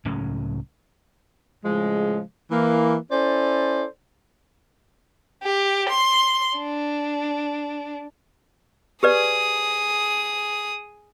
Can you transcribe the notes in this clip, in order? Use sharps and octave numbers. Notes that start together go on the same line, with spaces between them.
C#2 A2 F#3 C#4
A2 C#3 F3 G#3
E3 A#3
C#4 E4 A4 C5 D5
G4
C6
D4
G4 G#4 B4 D5 D#6